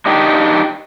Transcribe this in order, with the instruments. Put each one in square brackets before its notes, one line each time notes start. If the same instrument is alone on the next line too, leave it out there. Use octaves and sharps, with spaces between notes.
[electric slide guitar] D4 D#4 G4